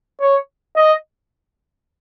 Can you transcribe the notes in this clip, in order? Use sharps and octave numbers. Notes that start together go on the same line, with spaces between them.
C#5
D#5